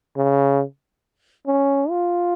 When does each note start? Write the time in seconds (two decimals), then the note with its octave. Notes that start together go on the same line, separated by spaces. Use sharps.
0.17 C#3
1.47 C#4
1.90 F4